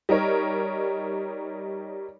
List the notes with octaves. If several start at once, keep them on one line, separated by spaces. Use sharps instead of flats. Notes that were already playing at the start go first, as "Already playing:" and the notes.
G3 D#4 A#4 C#5